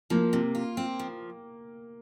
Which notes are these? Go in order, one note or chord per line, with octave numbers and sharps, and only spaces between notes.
F3 A#3
C3
F4
C4
F3